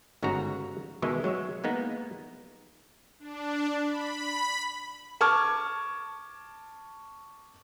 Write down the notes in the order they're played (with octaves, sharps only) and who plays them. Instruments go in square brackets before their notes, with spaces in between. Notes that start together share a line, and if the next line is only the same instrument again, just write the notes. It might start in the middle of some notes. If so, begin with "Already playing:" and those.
[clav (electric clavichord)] G1 G#2 C#3 D#4 F#4 A#5
B2 D#3 E3 G#3 E4 D#5
F#3 G#3 C#5 E5
G#3 A#3 B3 D#4
[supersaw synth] D4
B5
[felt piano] A5 C#6 D6 F6 G#6